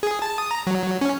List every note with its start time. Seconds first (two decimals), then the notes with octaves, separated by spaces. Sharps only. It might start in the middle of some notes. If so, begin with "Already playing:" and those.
0.03 G#4
0.22 A5
0.38 D#6
0.51 A#5
0.67 F#3
1.01 C#4